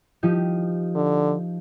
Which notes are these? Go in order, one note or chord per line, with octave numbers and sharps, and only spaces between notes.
F3 D#4 G4
D3